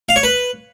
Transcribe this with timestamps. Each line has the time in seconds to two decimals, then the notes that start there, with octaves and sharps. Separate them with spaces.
0.09 F5
0.16 C#5
0.23 B4